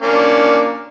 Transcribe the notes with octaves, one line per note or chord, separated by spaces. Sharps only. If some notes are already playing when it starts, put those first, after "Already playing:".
A#3 C#4 D4